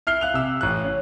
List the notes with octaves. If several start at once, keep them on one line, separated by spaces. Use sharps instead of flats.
E4 F6 C7 G7
F5 F#6 F7
C3 E6
A1 F#6
C#4